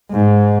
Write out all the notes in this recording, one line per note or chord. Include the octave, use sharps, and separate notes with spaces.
G#2